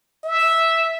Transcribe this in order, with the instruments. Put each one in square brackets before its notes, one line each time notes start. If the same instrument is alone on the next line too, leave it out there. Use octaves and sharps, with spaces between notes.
[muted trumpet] E5